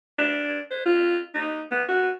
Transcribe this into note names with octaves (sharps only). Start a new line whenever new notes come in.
D4
C5
F4
D#4
B3
F#4